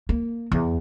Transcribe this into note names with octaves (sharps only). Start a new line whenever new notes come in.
A#3
E2